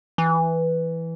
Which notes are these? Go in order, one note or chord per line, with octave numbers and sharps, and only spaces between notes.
E3